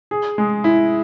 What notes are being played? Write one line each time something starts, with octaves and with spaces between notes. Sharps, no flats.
G#4
G#3
E4